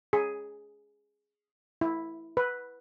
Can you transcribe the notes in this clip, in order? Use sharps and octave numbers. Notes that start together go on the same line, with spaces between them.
G#4
E4
B4